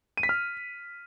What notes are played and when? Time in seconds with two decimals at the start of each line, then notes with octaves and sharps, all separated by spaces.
0.17 D#7
0.23 B6
0.29 F6